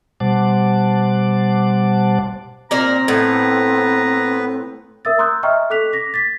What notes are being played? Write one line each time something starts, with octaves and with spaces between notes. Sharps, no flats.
B2 G3 C5 F#5 A5 D6
A#2 C4 A#4 D5 A#5
A2 B3 B4
A#4 E5 D#6 E6 A6
A#5 C6 D#6 E6 F#6 G6
D#5 E5 G5 A#5 C#6 F6
A4 D6 F#6 B6 F7
D6 A#6 B6
A6 B6